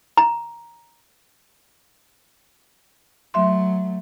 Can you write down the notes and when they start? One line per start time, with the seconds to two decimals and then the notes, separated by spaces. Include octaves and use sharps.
0.17 A#5
3.34 F#3 A3 E5 C6